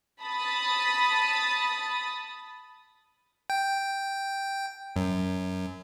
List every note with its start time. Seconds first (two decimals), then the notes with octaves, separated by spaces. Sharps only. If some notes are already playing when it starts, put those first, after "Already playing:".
0.22 A5 B5 D#6 A6
3.50 G5
4.96 F#2